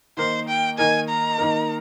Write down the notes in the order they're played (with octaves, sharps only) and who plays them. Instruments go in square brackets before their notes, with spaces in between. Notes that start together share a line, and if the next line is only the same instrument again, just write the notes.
[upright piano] D#3 A#3 D#4 A#4 [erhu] C5
[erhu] G5
[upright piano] D#3 A#3 D#4 A#4 [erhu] G#5
[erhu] A#5
[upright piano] D#3 A#3 D#4 A#4